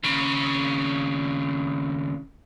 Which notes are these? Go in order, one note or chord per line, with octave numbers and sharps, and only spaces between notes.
D#2 C#3